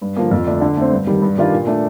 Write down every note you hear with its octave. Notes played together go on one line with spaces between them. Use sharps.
G2
D3 F3 A#3
F2
D3 A3 D4
D3
A3 C4
G2
D#3 G3
G2
D#3 G3 D4 F4
A#2
A3 D4